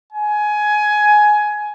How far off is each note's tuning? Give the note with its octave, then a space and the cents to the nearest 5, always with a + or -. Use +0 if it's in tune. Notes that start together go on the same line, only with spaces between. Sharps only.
G#5 +15